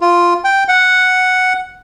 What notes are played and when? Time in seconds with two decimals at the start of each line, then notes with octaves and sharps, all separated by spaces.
0.01 F4
0.44 G5
0.68 F#5